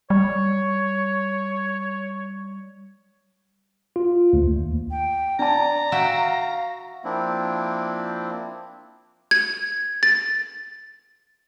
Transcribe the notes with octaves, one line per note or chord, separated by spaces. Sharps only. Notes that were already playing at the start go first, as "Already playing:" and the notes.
G3 C#5
F4
D2
D#2
G5
D4 D5 A5 A#5
F#4 E5 F5 G5
F3 A#3 C4 D4 E4
G#6
A6